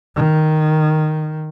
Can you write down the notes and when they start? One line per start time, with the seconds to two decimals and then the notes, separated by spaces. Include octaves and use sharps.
0.16 D#3